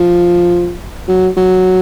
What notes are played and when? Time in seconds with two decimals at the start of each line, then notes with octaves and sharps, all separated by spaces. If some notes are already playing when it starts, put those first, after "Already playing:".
Already playing: F3
1.08 F#3
1.37 F#3